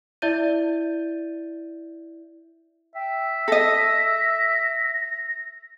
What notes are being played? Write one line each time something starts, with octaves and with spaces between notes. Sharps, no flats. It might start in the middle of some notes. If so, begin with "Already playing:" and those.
E4 D5 E5 G6 A6 D#7
E5 G5
A4 D#5 A#6